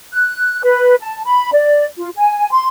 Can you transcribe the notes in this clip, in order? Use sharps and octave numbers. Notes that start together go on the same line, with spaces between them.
F#6
B4
A5
B5
D5
F4
G#5
C6